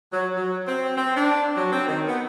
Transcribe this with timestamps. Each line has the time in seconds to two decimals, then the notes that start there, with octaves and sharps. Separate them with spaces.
0.13 F#3
0.36 F#3
0.67 C4
0.96 C4
1.15 D4
1.56 F#3
1.71 C4
1.88 D#3
2.07 B3